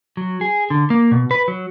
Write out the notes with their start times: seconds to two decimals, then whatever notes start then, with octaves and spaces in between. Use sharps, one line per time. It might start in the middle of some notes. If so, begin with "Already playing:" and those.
0.17 F#3
0.41 G#4
0.70 D3
0.90 A#3
1.11 B2
1.31 B4
1.48 F#3